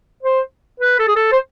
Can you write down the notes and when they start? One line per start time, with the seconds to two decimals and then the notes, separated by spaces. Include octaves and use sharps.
0.23 C5
0.80 B4
0.99 A4
1.08 G#4
1.16 A4
1.32 C5